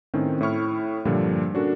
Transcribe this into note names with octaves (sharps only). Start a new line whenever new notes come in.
A2 D#3 C4 C#4
A2 E4 C#6 F6
G2 A#2 D3 F3 G3
C#4 D4 F#4 A4 A#4